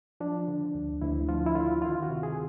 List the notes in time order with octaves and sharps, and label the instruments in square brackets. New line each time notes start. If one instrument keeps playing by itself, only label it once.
[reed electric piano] F3 D4
D3
D2
D2 E4
F3 F4
E4
D3 F4
D#3 F4
F#4
C3
G#4